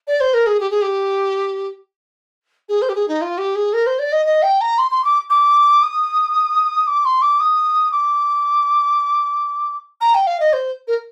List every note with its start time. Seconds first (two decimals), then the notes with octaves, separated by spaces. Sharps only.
0.07 D5
0.20 C5
0.34 A#4
0.46 G#4
0.60 G4
0.70 G#4
0.82 G4
2.69 G#4
2.82 C5
2.89 G4
2.95 G#4
3.08 D#4
3.21 F4
3.38 G4
3.55 G#4
3.73 A#4
3.86 C5
3.99 D5
4.12 D#5
4.26 D#5
4.43 G5
4.61 A#5
4.78 C6
4.91 C6
5.04 D6
5.30 D6
5.82 D#6
6.87 D6
7.05 C6
7.22 D6
7.40 D#6
7.92 D6
10.01 A#5
10.14 G5
10.27 F5
10.40 D#5
10.53 C5
10.88 A#4